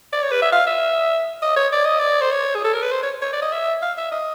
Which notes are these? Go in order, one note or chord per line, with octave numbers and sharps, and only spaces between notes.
D5
C#5
B4
E5
F5
E5
D#5
C#5
D5
D#5
D5
C5
C#5
G#4
A4
A#4
B4
C5
C#5
C#5
D5
D#5
E5
F5
E5
D#5